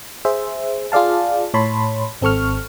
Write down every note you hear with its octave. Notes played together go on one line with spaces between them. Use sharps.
G#4 C5 E5
F4 G#4 D5 F5 A5
A2 C#5 A5 B5 C6
G#1 C4 A4 C#6 F6